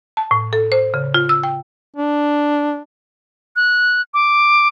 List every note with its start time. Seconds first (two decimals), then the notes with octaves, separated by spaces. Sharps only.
0.17 A5
0.31 A2
0.53 A4
0.72 C5
0.94 C#3
1.14 F4
1.29 E6
1.43 G5
1.97 D4
3.56 F#6
4.14 D6